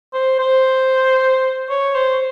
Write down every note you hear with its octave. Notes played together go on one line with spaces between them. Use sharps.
C5
C5
C#5
C5